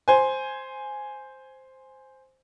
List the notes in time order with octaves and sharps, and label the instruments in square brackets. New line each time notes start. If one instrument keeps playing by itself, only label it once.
[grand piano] C5 G#5